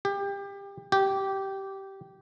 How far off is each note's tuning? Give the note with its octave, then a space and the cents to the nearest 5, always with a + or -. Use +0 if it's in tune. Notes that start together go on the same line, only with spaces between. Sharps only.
G4 +25
G4 -15